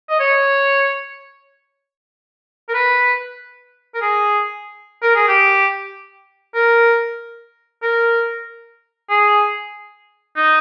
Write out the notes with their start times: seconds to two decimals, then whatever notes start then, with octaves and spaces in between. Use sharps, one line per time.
0.09 D#5
0.20 C#5
2.69 A#4
2.74 B4
3.94 A#4
4.01 G#4
5.02 A#4
5.15 G#4
5.28 G4
6.55 A#4
7.82 A#4
9.10 G#4
10.36 D#4